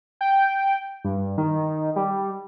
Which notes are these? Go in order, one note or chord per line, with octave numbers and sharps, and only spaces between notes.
G5
G2
D#3
G3